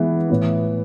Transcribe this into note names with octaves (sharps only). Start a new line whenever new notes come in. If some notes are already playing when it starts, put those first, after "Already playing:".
Already playing: E3 G#3 B3
A2 E3 B3